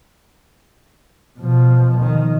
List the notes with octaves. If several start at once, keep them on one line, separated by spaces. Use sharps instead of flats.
B2 F3
D#3